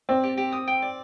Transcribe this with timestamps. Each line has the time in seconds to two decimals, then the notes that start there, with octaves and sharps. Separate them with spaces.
0.09 C4 D5
0.24 G4
0.37 G4
0.52 D#6
0.68 G5
0.82 D5